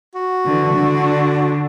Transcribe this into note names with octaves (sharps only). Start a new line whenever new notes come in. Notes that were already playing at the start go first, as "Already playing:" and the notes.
F#4
D3 E3
D3 D4